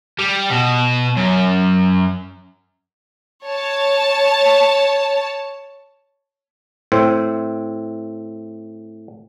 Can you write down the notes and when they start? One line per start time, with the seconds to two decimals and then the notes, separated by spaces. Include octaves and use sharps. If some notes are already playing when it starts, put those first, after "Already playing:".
0.19 G3
0.51 B2
1.17 F#2
3.45 C#5 A5
6.92 A2 C4